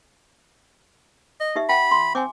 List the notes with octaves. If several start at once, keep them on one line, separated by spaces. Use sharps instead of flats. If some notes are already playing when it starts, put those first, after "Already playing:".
D#5
D#4 G4 E5
E5 F#5 G5 B5
C6
C4 G#5 D6